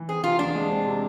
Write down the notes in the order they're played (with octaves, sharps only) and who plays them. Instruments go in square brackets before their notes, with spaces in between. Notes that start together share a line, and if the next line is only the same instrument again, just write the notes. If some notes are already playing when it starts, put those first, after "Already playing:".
Already playing: [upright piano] E3
[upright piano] C4 [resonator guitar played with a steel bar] G#4
[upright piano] C3 [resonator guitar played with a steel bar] F4
[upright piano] E2 [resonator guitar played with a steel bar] D4
[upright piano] G#3
C4
C3